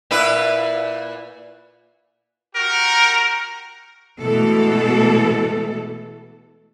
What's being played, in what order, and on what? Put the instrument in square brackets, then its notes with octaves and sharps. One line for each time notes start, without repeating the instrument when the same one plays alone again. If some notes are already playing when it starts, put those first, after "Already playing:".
[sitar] A#2 E4 B4
[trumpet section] F#4 G4 A#4
[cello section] B2 E3 G#3 A3 A4